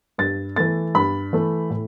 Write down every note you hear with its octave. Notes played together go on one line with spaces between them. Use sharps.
G2 A6
E3 A3 A6
G2 B5
E3 A3
A2